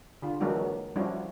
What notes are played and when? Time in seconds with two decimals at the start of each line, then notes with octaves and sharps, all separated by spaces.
0.22 D3 F4
0.40 E3 F#3 G#3 A#3 D4 F#4
0.96 F3 G3 C#4 D4 E4 F#4